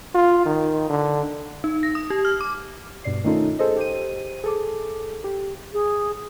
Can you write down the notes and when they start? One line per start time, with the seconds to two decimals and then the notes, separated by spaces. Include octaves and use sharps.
0.14 F4
0.45 D#3
0.90 D3
1.64 D#4
1.83 A#6
1.95 D#6
2.10 G4
2.25 F6
2.41 D6
3.04 G2 B2 D5 C7
3.24 D#3 A3 C#4 D#4 F4 A4
3.59 G#4 A4 C5 D#5
3.76 G4 C5 D#7
4.44 G#4 A4 D6
5.24 G4
5.72 G#4